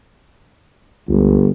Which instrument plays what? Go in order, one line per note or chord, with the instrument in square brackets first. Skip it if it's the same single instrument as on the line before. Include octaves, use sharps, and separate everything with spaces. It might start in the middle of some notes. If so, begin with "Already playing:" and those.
[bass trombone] G1 [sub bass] C#2